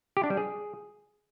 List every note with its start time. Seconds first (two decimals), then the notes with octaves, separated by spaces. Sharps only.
0.17 G4
0.24 D4
0.30 G3
0.37 G#4